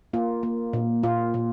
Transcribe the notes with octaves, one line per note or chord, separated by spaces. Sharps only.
A#3 F4
A#3
A#2
A#2 F4
A#2